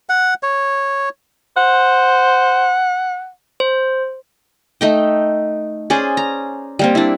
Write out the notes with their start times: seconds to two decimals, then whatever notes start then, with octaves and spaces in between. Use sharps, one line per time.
0.09 F#5
0.43 C#5
1.57 C5 F#5
3.60 C5
4.81 A3 D#4 G5
5.90 C#4 G#4 C5 D5
6.17 A#5
6.79 G3 A#3 C4
6.95 D4 E4